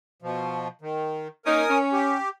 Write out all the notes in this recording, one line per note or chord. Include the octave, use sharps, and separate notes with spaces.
B2 F3
D#3
A#3 C#4 D#4 A#4 G#5 D#6
C#4
G4